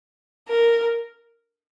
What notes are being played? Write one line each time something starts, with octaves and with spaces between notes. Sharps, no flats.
A#4